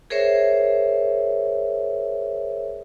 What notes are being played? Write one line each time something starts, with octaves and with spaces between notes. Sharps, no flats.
G#4 A#4 C5 C#5 E5